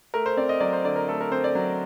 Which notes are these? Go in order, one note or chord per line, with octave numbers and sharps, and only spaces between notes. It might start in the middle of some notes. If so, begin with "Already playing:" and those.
A3 A#4
C5
C4 D5
D#5
F#3 D5
C5
D3 D5
A#4
A3 A4
A#4
C4 C5
D5
F#3